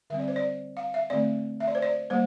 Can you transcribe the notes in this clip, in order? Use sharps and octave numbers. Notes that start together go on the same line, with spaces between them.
D3 G3 C4 E5
D5
C5
D5
F5
E5
D3 A3 C4 D5
E5
D5
C5
D5
G3 A#3 C5